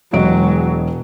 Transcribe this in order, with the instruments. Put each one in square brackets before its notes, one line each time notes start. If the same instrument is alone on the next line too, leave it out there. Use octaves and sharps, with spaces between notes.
[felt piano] E1 D#5 D7 [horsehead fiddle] F#3 G#3